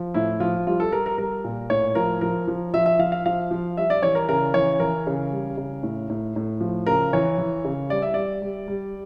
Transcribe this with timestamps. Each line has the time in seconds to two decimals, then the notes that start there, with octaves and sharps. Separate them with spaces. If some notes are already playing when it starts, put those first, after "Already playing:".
Already playing: F3
0.14 A2 E4
0.40 F3 F4
0.67 G3 F4
0.80 A4
0.92 G3 A#4
1.06 A#4
1.18 G3 A#4
1.44 A#2
1.70 A2 C#5
1.95 F3 A#4
2.21 F3 A#4
2.48 F3
2.74 F3 E5
2.86 E5
2.99 F3 F5
3.12 F5
3.26 F3 F5
3.51 F3
3.77 G3 E5
3.90 D5
4.03 E3 C#5
4.15 A#4
4.29 C#3 A#4
4.54 E3 C#5
4.80 E3 A#4
5.07 C#3
5.31 G3
5.57 C#3
5.83 A2
6.10 A2
6.36 A2
6.61 F3
6.86 C#3 A#4
7.13 E3 C#5
7.38 E3
7.65 C#3
7.90 G3 D5
8.02 E5
8.14 G3 D5
8.42 G3
8.68 G3